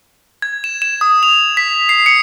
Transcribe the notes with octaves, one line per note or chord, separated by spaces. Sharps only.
G#6
E7
E7
D#6
F7
B6
C7
C#7